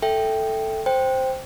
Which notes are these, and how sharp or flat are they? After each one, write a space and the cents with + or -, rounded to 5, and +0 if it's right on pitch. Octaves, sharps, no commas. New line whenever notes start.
A4 +0 E5 +0 G5 +0
C5 +0 G5 +0